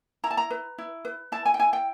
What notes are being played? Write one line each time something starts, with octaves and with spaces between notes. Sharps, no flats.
E4 A#5
A5
A#5
B4
E4
B4
E4 A5
G#5
G5
E4 G#5
G5